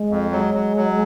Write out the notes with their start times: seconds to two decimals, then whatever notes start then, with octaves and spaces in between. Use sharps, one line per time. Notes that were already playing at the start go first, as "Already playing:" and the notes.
Already playing: G#3
0.10 F2
0.31 F#3 G#3
0.54 F#3
0.77 F#3